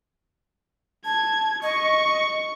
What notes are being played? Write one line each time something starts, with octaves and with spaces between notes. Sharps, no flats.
A5 G#6
D#5 C#6